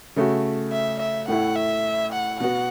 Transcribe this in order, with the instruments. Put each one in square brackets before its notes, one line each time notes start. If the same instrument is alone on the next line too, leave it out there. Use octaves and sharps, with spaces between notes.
[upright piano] C#3 A3 F#4
[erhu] E5
E5
[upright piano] A2 A3 E4 [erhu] F#5
[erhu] E5
F#5
[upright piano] B2 B3 F#4 [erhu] F#5